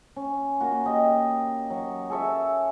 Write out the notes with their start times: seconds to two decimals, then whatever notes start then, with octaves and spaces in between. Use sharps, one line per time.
0.16 C#4
0.60 A#3 F#4
0.86 G4 D#5
1.70 F#3
2.10 G#4 A4 C#5 E5